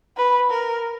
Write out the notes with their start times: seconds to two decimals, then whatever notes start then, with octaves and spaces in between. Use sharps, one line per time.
0.16 B4
0.50 A#4